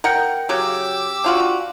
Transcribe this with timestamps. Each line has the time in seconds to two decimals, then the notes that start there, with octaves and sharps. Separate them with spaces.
0.04 A#4 F#5 G5
0.49 C#3 F#3 G4 D6 E6
1.24 D4 F4 F#4